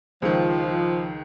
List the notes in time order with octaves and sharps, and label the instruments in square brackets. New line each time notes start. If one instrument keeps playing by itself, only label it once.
[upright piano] C#2 D#3 [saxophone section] F3